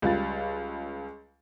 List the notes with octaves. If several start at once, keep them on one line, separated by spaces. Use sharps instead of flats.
C#2 G3 F4 A6